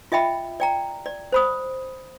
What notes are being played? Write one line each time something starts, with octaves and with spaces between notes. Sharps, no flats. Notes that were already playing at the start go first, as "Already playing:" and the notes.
F4 D#5 E5 G5 B5
D5 G5 A#5
D5
C5 B5 D#6